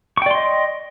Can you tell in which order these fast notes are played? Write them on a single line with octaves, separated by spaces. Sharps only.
C#6 G5 D5 C6 D#5